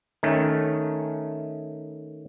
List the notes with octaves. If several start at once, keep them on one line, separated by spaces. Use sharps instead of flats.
D#3 A3 C#4